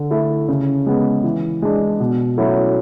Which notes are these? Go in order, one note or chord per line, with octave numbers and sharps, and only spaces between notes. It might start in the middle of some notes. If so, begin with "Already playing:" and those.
Already playing: D3
A3 E4
C#3
G#3 B3
E3
G#3 D4
B2
F#3 A3 C#4 E4